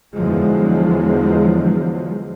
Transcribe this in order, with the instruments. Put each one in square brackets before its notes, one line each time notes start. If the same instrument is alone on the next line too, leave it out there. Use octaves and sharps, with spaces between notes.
[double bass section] E2 D3 F3 F#3 G#3